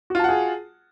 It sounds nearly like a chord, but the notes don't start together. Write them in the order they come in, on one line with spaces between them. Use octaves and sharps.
F#4 F4 A5 F#5 G#4